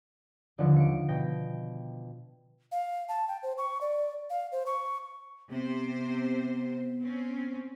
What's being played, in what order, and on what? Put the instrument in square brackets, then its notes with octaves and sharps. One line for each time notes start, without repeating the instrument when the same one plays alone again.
[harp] D#1 C#2 D3 F3 C#7
C#7 D7
B2 G5 A#6
[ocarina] F5
A5
G5
C5
C#6
D5
F5
C5
C#6
[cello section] C3 C5 [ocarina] B3
[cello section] C4 C#4